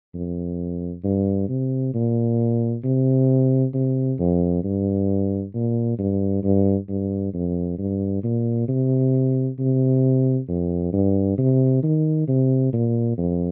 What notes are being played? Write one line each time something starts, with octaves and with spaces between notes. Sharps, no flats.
F2
G2
C3
A#2
C3
C3
F2
G2
A#2
G2
G2
G2
F2
G2
A#2
C3
C3
F2
G2
C3
D#3
C3
A#2
F2